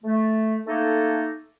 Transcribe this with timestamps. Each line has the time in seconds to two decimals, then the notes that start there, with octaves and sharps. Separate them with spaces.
0.04 A3
0.67 A3 A#3 D#4 A4